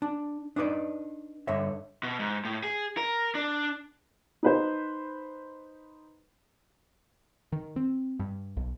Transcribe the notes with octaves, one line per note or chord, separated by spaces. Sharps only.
D4
D4 D#4 B4 D5
G2 D3 C#5 E5
B2
G#2
A2
G#4
A#4
D4
D#4 B4 C5
D#3
C4
G2
B1